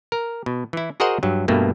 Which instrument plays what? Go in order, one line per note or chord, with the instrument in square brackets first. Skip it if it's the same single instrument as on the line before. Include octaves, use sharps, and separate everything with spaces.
[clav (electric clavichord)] A#4
B2
E3 E4
F#4 G#4 A#4 C5 D#5 F#5
G2 F#3
G2 B2 A3 A#3